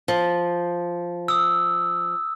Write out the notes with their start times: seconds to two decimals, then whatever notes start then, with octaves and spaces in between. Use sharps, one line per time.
0.08 F3
1.28 D#6 E6